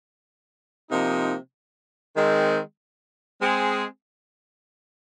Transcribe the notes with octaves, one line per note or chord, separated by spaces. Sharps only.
C3 F3 A#3 D#4
D#3 G#3 C4
G#3 C4 G#4